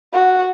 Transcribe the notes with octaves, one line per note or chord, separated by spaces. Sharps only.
F#4